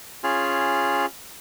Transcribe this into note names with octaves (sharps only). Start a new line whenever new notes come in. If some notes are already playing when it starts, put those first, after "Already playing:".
C#4 F4 G#4